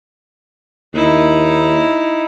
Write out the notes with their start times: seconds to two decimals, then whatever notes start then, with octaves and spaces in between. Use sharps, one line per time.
0.94 D#2 D#4 E4